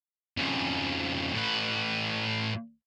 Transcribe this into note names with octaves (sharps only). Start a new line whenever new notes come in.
F2 C#3
A2 B4